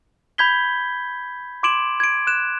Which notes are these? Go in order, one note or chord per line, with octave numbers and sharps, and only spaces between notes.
B5 G6 G#6 B6 G7
C6 D6 G#6 D7 E7 F#7
G#6 D7
F#6 E7